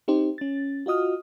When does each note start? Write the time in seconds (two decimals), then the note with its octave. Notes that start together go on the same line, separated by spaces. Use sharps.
0.08 C4 D#4 G4 C5
0.38 C#4 A6
0.86 F4 F#4 D#5 D#6 F6